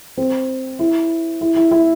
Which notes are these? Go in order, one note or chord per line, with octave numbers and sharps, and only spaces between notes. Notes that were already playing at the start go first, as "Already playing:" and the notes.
C4
E4
E4
E4
E4